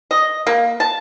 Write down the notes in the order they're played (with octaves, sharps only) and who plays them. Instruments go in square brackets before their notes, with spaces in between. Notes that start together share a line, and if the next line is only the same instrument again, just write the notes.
[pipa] D#5
A#3
A5